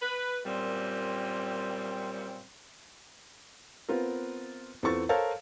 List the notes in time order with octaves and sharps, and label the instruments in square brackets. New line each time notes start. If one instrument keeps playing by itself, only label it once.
[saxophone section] B4
F#2 A#2 G3 C4
[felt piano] B3 C4 F4 A#4
E2 C4 F4 A4 C#6 A6
A4 A#4 C5 C#5 F5 A5